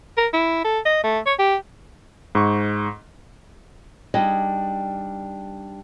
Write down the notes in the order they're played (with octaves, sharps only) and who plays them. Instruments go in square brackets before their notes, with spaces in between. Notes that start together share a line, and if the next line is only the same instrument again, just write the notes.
[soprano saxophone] A#4
E4
A4
D#5
A3
C#5
G4
[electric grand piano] G#2 C#6
[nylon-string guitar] G3 D4 D#4 G#4 D#5